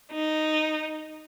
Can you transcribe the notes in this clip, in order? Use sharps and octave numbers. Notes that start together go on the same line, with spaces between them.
D#4